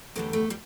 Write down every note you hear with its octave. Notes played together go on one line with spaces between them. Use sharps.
E2 D3 G3 A3
A3
G3